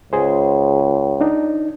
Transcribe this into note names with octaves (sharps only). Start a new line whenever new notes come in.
C#2 G#4 C5
D4 D#4